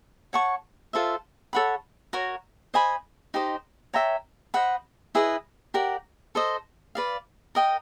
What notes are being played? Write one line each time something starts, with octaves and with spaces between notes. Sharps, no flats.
C#5 F#5 A5 C#6
F4 A4 C5 E5
A4 C#5 F#5 B5
F#4 A#4 C#5
C5 D#5 G#5 B5
D#4 G4 C5 D#5
C#5 E5 G5 A#5
C5 D#5 F#5 B5
E4 G#4 B4 D#5
G4 A#4 D5 F#5
A4 C5 D#5
B4 D5 F5
A#4 D#5 G5